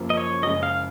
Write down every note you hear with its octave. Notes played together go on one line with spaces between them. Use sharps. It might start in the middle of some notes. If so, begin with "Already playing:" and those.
Already playing: F#1 F#2 F3 A#3
D#5
C#5
F#1 F#2 C#3 G#3 D#5
F5